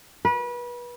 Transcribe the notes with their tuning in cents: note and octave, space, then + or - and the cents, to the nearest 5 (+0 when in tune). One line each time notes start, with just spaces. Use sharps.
B4 -30